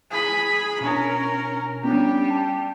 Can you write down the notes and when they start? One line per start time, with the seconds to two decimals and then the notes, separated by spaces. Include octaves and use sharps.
0.11 G#4 B5
0.81 B2 C#4 D4 A#4
1.84 G3 B3 C#4 D4 G4
2.28 G5 A5